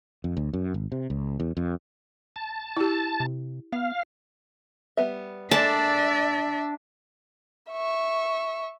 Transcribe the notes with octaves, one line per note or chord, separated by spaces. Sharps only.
F2
D2
F#2
G#1
C3
C#2
E2
F2
A5
E4 G4
C3
B3 F5
G3 B3 E5
G#3 A#3 D4 A4 D5 E5 A5
E5 C#6